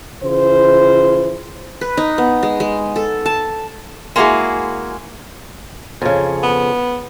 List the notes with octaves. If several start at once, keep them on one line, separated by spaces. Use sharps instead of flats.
C#3 E3 F4 C5
B4
D#4
B3
G#3
G#3
A4
A5
G#3 A#3 B3 E4 F#4 G#4
F2 C#3
B3